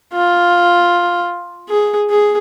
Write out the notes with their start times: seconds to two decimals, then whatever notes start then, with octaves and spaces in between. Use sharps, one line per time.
0.13 F4
1.69 G#4
2.10 G#4